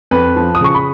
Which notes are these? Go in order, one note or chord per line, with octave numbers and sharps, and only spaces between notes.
F2 B4
F3
D#6
C#3 C#6
B5